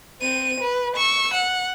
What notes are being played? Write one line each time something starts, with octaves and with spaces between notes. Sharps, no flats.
C4 D#7
B4
C#6 E6
F#5